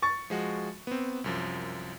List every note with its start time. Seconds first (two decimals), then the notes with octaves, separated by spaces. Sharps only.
0.02 C#6 A6
0.30 F3 G#3 F#4
0.87 B3 C4
1.24 C2 F#2 F3